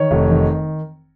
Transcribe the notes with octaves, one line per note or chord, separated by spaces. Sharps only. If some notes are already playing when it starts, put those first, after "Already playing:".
Already playing: D#3 C#5
F1
D#3